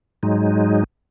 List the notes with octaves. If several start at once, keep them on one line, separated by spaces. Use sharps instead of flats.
G#2 F#3 G#3 D#4